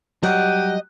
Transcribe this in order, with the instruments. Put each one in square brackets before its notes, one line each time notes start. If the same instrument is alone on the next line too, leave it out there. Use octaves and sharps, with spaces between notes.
[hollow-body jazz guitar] F#3 G3 [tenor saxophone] G4 [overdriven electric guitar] D#5 [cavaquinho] F#5